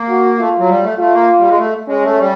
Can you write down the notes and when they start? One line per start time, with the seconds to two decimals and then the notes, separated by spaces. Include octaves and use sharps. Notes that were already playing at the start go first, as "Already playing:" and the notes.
Already playing: A#3
0.09 F#4
0.39 A3 F4
0.59 F#3
0.69 G3
0.83 A3
0.98 A3 F4
1.13 A#3
1.38 G3
1.48 G#3
1.58 A3
1.88 G#3 C#4
2.03 A3
2.19 G3